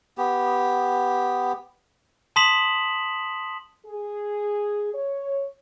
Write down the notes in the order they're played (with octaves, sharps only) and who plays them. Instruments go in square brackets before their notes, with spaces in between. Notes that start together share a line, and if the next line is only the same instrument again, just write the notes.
[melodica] B3 G4
[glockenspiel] A5 C6 D#6 B6 E7 F#7
[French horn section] G#4
C#5